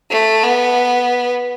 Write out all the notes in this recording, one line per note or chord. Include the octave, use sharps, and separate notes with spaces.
A3
B3